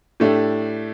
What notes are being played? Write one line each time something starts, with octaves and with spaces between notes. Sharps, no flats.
A2 A3 D4 G4